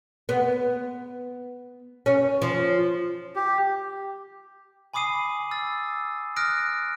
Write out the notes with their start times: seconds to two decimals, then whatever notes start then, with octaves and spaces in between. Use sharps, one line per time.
0.29 B3
2.06 C#4
2.42 F3
3.36 G4
4.94 G#5 B5 D6 D#6 C7 D#7
5.51 E6 A6
6.36 D#6 F6 F#6 A#6 D7